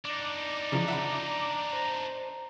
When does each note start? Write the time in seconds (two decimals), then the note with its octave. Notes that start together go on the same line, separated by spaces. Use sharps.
0.05 D4 D#4 D5 D6
0.72 C#3 E3 F3 A#5
0.88 E5 F#5 B5
1.73 C5